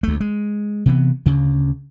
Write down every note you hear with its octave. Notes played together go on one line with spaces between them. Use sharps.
D2 A3
G#3
C3 E3 B3
D2 C#3